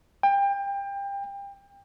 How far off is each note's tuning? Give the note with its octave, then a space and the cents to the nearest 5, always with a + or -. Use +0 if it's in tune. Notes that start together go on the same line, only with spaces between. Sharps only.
G5 +25